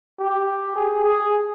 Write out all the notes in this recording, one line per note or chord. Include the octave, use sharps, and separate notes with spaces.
G4
G#4
G#4